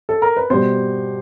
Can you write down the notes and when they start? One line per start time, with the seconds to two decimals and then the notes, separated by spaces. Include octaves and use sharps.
0.09 A4
0.22 A#4
0.37 B4
0.50 B2 G3 C5